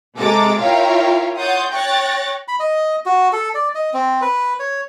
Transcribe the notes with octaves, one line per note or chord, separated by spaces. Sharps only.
C3 G#3 A4 A#5 D6 A6
E4 F4 A#4 C#5 F5 G5
C#5 F#5 C6 D#6 G6 A6
C#5 G5 C#6 F#6 A6 A#6
B5
D#5
F#4
A4
D5
D#5
C4
B4
C#5